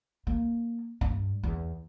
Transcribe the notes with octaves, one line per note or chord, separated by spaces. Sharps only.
A#3
G2
E2